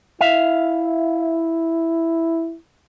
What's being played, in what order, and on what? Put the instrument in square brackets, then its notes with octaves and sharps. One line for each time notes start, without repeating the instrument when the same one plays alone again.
[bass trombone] E4 [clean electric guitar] E5 F5